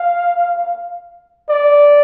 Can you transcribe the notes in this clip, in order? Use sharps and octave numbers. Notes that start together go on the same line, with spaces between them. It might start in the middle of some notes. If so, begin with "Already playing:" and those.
Already playing: F5
D5